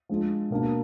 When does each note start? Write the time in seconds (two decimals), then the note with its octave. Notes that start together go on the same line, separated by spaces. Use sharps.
0.09 F3 G#3 D4
0.50 B2 A#3 D4